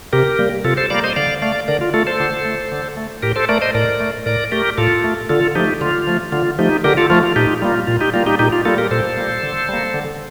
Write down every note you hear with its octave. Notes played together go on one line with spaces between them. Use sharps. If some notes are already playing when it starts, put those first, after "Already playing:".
C3 G4 A#4
G3 A#3
C3 F4 A4
A4 C5
G3 A#3 D5 F5
C5 D#5
D3 D5 F5
A3 D5 F5
D3 A#4 D5
F4
A3 F4 A4
A4 C5
D3
A3
D3
A3
A2 G4 A#4
A4 C5
A3 A#4 D5
C5 D#5
A2 A#4 D5
A3
A2 A#4 D5
A3 G4 A#4
A2 F4 A4
A3
D3 F4 A4
F3 A3 D#4 G4
D3 F4
F3 A3
D3 F4
F3 A3 D#4 G4
D3 G4 A#4
F4 A4
F3 A3 F4
F4
A#2 D#4 G4
G3 A#3 F4
A#2 F4
D#4 G4
G3 A#3 F4
D#4 G4
A#2 D#4 G4
F4
G3 A#3 F4 A4
G4 A#4
A#2 A4 C5
G3 A#3
D3
G3 A#3
D3